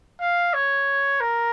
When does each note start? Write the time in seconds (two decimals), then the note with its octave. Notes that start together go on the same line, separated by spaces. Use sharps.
0.20 F5
0.53 C#5
1.20 A#4